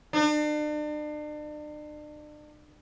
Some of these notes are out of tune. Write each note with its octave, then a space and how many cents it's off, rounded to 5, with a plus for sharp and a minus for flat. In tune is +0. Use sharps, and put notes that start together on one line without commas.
D4 +40